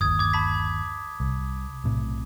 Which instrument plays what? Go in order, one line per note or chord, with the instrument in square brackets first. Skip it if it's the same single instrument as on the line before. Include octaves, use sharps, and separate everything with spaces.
[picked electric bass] G1 D#2 [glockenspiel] D#6 G#6
[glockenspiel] D6 G#6
A5 B5 B6
[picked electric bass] C2
B1 A2 C3